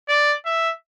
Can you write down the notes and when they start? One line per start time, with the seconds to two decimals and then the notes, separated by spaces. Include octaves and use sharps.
0.08 D5
0.46 E5